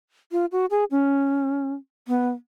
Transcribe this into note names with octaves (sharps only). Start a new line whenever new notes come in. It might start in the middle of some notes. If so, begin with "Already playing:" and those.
F4
F#4
G#4
C#4
B3